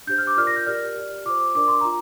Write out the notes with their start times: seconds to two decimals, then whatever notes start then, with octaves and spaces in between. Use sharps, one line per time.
0.07 D4 G4 C5 G6
0.18 F6
0.27 D6
0.37 F4 A#4 D5 F6
0.47 A#6
0.56 G6
0.67 G4 A#4 D5 F6
0.96 G4 D5
1.25 F4 C5 D6
1.55 D4 A#4 D5 D6
1.68 C6
1.81 F4 A#5